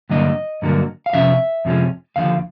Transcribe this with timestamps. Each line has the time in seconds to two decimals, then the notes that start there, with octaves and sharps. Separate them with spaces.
0.10 G2 D3 F#3 A#3 D4 D#5
0.62 G2 D3 F#3 A#3 D4
1.06 F5
1.13 F2 C3 F3 C#4 E5
1.65 F2 C3 F3 G#3 C#4
2.16 D#2 D3 F3 F5